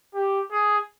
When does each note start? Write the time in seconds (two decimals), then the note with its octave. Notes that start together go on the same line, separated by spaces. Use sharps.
0.15 G4
0.52 G#4